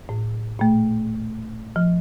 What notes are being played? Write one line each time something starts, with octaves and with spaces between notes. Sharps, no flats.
A2
A#2 A3
F3